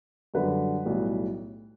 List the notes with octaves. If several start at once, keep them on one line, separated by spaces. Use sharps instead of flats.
F#2 D3 G3 B4
B1 A2 G3